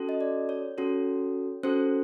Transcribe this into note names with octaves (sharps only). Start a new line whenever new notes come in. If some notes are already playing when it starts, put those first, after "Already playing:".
Already playing: C#4 F#4 A4
D#5
D5
C#5
C#4 F#4 A4
C#4 F#4 A4 C5